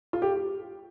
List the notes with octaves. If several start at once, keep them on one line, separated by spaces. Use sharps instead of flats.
F4
G4